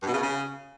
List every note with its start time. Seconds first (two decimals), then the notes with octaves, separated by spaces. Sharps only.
0.02 G2
0.07 B2
0.12 C#3
0.18 B2
0.23 C#3